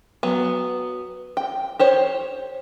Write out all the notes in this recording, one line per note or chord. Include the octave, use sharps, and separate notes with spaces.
F#3 B3
G5
G4 C5 C#5